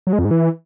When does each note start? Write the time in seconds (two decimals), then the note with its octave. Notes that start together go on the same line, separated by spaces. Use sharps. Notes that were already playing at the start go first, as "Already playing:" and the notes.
0.07 F#3
0.13 G#3
0.19 F2
0.25 G#2
0.31 E3